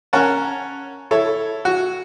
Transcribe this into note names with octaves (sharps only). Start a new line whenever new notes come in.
C#4 A#4 C#5 F#5 A5
E4 A4 C#5
F#4